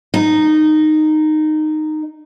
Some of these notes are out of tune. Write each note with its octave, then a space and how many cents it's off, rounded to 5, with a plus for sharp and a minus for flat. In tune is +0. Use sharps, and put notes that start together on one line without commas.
D#4 -10